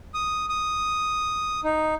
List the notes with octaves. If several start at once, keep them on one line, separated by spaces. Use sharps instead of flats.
D#6
D#6
D#4